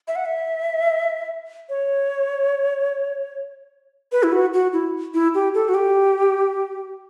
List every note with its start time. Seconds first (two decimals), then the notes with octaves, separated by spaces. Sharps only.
0.08 E5
0.16 F#5
0.25 E5
1.69 C#5
4.12 B4
4.23 E4
4.32 F#4
4.53 F#4
4.73 E4
5.14 E4
5.35 G4
5.54 A4
5.68 F#4
5.74 G4